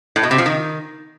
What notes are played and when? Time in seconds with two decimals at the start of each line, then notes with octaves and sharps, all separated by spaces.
0.16 A2
0.23 B2
0.31 C3
0.38 F3
0.46 D#3